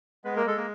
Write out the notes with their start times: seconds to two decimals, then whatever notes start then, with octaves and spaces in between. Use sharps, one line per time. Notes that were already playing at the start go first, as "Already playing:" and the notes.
0.24 G#3 B3 B4
0.36 A#3 A#4
0.46 G#3 A4
0.57 A#3 A#4